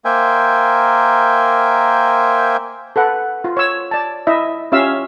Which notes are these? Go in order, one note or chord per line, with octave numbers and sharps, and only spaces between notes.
A#3 A#4 C5 E5 G5 G#5
A4 B4 F#5
F4
C#5 E6
D5 A5
E4 D#5 E5
C#4 F4 G4 E5 F5 E6